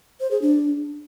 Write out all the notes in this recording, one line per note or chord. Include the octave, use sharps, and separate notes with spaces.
C5
G#4
D4